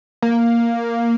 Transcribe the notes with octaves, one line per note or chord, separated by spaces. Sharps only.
A#3